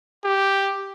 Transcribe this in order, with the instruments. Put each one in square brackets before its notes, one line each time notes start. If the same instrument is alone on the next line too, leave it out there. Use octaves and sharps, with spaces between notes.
[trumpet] G4